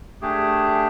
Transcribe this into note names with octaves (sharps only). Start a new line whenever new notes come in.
A3 D4 G4 G#4